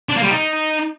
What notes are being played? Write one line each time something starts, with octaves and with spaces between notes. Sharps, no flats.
D4
A#3
G3
D#4